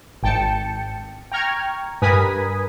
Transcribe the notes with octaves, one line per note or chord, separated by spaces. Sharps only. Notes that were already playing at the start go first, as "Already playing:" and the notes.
G#1 G5 A5 C#7
G5 A#5 C#6 F6 G#6
G2 A#4 B4 G#5 D#6 B6